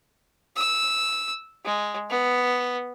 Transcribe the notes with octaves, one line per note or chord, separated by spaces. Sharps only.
E6
G#3
B3